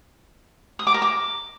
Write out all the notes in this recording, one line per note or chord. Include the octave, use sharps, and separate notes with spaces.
D#6
D6
A#4
D6